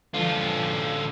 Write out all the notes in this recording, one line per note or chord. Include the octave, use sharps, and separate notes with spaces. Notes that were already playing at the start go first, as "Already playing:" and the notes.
D3 F3 F4